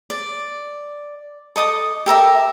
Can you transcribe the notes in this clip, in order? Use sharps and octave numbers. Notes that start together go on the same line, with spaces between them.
D5
A4 D#5 D6 D#6
G4 A4 A#4 E5